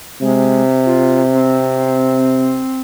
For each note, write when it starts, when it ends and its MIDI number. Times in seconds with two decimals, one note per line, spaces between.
0.21 2.64 48
0.21 0.62 56
0.86 1.22 65
1.33 2.81 60